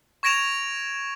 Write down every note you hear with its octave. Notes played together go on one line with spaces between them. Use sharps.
C#6 G#6 A#6 D7 E7 F7